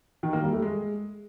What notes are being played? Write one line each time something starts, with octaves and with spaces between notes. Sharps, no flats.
D#3
A#3
G3
A3
G#3